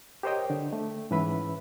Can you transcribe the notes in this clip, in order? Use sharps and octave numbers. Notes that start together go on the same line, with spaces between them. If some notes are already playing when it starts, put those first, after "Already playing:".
G4 A#4 C5 C#5 D#5 G5
D3 D4
A3
G#2 E3 C#4 B4 E5 B5